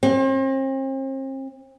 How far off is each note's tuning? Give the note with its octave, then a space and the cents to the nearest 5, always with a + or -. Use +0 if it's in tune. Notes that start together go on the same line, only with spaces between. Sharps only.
C4 +40